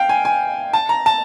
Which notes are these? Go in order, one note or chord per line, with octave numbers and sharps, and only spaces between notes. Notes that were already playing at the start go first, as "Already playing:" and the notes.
Already playing: F5 G5
G#5
G#5
A5
A#5
A5